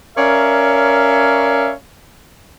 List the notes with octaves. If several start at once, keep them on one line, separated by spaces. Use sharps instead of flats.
C#4 A#4 C#5 D5 E5 F5